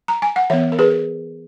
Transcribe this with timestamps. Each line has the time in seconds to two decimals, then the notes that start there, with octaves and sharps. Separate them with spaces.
0.08 A#5
0.22 G#5
0.36 F#5
0.50 E3 B3 C#5 E5
0.72 A#4
0.79 G#4 B4